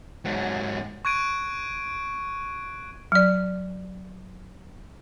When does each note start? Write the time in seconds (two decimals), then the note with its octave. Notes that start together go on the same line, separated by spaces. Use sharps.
0.25 G#2 F#3
1.05 C#6 F#6 G#6 D7 D#7
3.12 F#3 D5